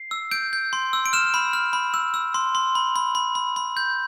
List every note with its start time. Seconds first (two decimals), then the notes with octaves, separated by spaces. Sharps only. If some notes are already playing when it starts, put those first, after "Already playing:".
Already playing: C7
0.11 E6
0.31 G6 D7
0.53 G6
0.73 C6
0.93 E6
1.06 D7
1.13 F6 E7
1.34 B5
1.53 F6
1.73 B5
1.94 E6
2.14 E6
2.34 C6
2.55 C6
2.75 B5
2.96 B5
3.15 B5
3.35 B5
3.56 B5
3.77 G6